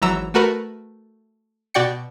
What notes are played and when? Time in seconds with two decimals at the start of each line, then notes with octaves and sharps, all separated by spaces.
0.02 G#1 E3 F#3 A#5 E6
0.34 A3 F#4 A#4 B4
1.74 B2 F#4 D5 G5 C#7